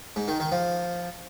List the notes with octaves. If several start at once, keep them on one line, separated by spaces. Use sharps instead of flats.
G#2
D#3
D#3
F3